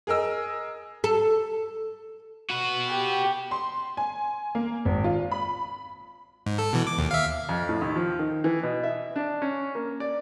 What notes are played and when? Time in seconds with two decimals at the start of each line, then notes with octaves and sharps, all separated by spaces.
0.07 G#4 A#4 D#5 E6
1.04 A4
2.50 F#4 B4
2.89 G4
3.51 C6
3.97 G#5
4.55 A#3
4.85 G#1
5.04 F4
5.31 B5
6.46 G#2
6.59 A4
6.73 B2 E3
6.87 D6
6.99 D#2
7.11 E5 F5
7.49 F2
7.69 A2
7.82 D#2
7.96 F3
8.19 D#3
8.44 E3
8.63 B2
8.83 E5
9.16 D4
9.42 C#4
9.75 A#3
10.00 D5